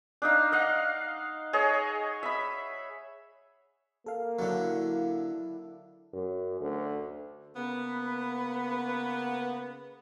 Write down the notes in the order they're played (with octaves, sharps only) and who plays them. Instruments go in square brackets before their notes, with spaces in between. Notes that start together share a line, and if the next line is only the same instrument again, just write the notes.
[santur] D4 D#4 F5
D#5 F5 F#5
G#4 C#5 D#5
E5 B5
[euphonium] A#3 [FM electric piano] A4 F5
[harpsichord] D3 F#3 [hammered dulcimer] D4 E4
[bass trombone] F#2
D2
[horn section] C#3 A#3 B3 [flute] B4